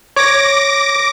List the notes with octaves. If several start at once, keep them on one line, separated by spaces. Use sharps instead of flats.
C#5 D6 A#6